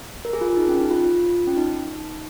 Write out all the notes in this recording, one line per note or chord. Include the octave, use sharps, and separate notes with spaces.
A#4
G#4
F4
G#4
D#4
C#4
D#4
F4
C#4
D#4